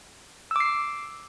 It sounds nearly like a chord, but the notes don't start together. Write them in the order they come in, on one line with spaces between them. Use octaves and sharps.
E6 D6 C7